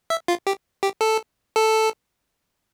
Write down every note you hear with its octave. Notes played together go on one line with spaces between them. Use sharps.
E5
F4
G4
G4
A4
A4